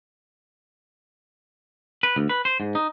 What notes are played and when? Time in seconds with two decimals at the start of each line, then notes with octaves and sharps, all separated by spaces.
2.03 B4
2.16 D2
2.29 B4
2.45 C5
2.60 G#2
2.75 D#4